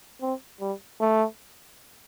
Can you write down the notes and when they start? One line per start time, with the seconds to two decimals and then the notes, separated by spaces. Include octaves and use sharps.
0.22 C4
0.61 G3
1.01 A3